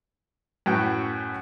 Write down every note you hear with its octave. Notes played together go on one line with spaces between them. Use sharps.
F#2 A2 F#4 B4 G5